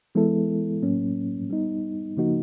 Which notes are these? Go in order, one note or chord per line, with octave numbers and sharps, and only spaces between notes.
E3 G#3 B3 E4 A4
A2 F#3 A#3 C#4
G3 B3 D#4
C#3 F3 A#3 D#4 F#4